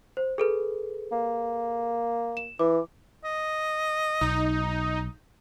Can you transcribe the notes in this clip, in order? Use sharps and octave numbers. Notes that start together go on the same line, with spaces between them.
C5
G#4 A4 B4
A#3
E7
E3 D6
D#5
B1 D#4